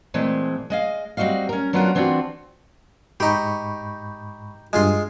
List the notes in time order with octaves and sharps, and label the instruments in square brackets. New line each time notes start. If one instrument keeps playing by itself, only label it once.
[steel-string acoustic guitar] A#2 E3 G#3 A3 C4
G#3 D#5 F5
G3 C4 F#4 D#5 F5
C#4 A#4
F#3 B3 D4 F4 F#4 A#4
E3 C4 D4 F4 F#4
[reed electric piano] G#2 B5 C#6 [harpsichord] D#4 G4
[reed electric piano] G2 D#6 [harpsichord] G#3 F4 C6